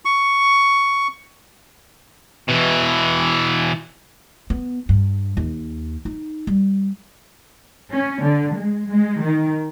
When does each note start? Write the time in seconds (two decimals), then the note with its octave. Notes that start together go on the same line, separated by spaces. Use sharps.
0.05 C#6
2.48 B2 E3
4.50 B3
4.89 G2
5.37 D#2
6.05 D#4
6.47 G3
7.93 C#4
8.24 D3
8.57 G#3
8.91 G#3
9.23 D#3